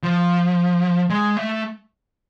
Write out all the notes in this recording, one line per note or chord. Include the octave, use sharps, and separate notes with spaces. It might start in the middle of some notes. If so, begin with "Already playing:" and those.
F3
G#3
A3